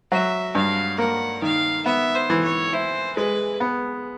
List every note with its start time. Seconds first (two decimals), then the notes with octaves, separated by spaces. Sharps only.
0.11 F#3 E5
0.55 G2 F5
0.98 A#3 F#5
1.42 D#3 F5
1.86 B3 E5
2.15 C5
2.30 E3
2.44 C#5
2.73 E4 C5
3.16 G#3 B4
3.60 B3